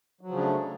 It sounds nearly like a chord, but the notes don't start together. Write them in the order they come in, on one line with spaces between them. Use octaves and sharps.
F#3 F3 C#3 D4 A3